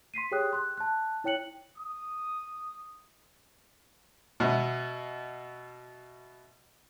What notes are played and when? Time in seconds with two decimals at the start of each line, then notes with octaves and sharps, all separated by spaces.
0.14 C6 B6 C7 D#7
0.31 G4 G#4 C#5 G5 D#6 F#6
0.53 C6 F#6
0.77 A5 F#6
1.24 E4 C#5 G5 F#6 C#7 F#7
1.77 D#6
4.40 B2 B3 E5